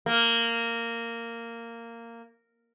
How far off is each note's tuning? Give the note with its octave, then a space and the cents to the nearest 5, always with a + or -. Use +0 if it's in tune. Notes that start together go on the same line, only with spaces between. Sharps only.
A#3 -10